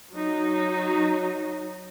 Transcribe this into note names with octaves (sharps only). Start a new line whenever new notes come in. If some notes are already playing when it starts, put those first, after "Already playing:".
F#3 D#4